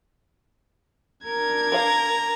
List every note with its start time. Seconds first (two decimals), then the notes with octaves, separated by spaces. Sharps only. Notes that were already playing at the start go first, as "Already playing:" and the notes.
1.25 D4 A#4 G#6
1.72 B4 C#5 F5 A#5